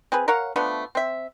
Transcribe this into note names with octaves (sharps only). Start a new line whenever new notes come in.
C4 G#4 B4
A#4 C#5 F5 F#5
F3 A3 B3 D4
C4 E5